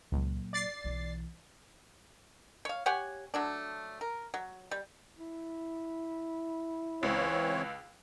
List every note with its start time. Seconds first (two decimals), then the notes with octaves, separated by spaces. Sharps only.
0.12 C#2 A#2 F#3
0.53 D5 A6 C7
0.84 B1 E3
2.65 C#5 F5
2.86 G4 C#5 F#5 G#5
3.34 F#3 A3 D4
4.01 A#4
4.34 F#3
4.71 G3
5.18 E4
7.03 C#2 E3 C4 C#5